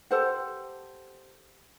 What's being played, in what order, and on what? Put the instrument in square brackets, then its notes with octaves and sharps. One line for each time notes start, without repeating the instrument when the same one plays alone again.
[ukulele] G4 A4 C5 F#5